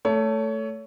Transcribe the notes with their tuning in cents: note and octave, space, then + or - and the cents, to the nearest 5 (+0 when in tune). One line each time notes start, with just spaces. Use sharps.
A3 +5 C#5 +25